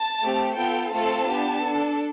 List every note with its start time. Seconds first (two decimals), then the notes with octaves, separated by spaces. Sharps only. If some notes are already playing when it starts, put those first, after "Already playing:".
Already playing: A5
0.21 A3 C4 G4
0.56 B3 F4 A4 G5
0.93 A3 C4 F4 A4 A5
1.29 B3 D4 G4
1.65 D4 A4